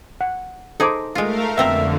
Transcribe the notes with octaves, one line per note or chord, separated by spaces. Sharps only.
F#5
D#4 G#4 A4 C5 D6
G#3 A3 F4 A#4 F5
F2 B2 D3 C4 E5 A#5